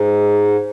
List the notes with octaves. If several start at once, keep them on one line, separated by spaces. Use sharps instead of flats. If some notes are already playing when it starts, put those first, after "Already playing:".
Already playing: G#2